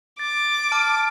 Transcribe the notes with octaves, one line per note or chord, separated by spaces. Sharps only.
D6 A6
A5 F6 D7